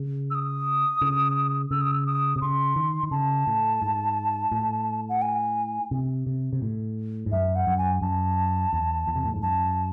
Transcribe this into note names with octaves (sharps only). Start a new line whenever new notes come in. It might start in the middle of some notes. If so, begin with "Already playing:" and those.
Already playing: C#3
E6
D#6
C#3
C#3 E6
D#6
E6
D#6
C3
C#3 C6
D#3
D#3
C#3 A5
A2
G#2
A2
F#5
G#5
C3
C3
C3
A2
G#2
F#2 E5
F#5
F#2
G#5
F#2 A5
E2
E2
C3
A2
G#2
F#2 A5